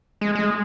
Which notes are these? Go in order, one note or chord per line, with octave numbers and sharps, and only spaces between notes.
G#3
G#3